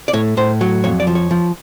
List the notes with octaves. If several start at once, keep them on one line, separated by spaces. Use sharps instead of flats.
D5
A2 C#5
A2 C5
F#3
F2 C#5
D5
F3
C#5
F3